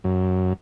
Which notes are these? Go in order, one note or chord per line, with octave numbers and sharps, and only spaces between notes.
F#2